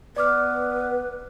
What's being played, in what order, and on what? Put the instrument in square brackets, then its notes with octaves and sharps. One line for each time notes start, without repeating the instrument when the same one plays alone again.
[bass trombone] B3 [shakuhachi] B4 [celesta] D5 D6 F6